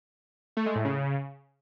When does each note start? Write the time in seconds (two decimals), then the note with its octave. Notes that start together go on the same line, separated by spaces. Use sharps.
0.57 A3
0.66 G#3
0.75 A2
0.85 C#3